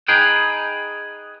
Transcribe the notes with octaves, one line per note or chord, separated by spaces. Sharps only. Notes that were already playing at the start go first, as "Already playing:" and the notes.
D#4 G#4 B4 G5